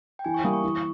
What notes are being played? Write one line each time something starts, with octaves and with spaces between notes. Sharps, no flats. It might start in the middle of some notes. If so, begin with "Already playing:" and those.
G5
E3 G#5
C#6
G3 A#3 E4 D#6
C#6
E3